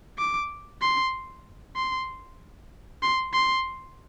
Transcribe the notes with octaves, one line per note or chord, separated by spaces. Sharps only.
D6
C6
C6
C6
C6